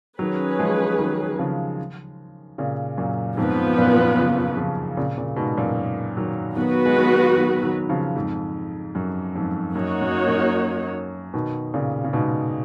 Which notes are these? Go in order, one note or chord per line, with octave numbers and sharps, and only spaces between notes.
D#3 F#3 C#4 G#4 B4
F3 G#3
D#3 F#3
C#3 F3
A#2 C#3
F#2 A#2
F2 G#2 F3 B3 F4 B4
F#2 A#2
A#2 C#3
C#3 F3
A#2 C#3
A#2 C#3
G#2 B2
F#2 A#2
D#3 F#3
D#3 F#3 B3 F#4 B4
G#3
D#3 F#3
D#3 F#3
D#3 F#3
C#3 F3
F2 G#2
F#2
F2 G#2
F#2 A#3 D#4 F#4 C#5
F#2
F#2
B2 D#3
A#2 C#3
C#3
G#2 B2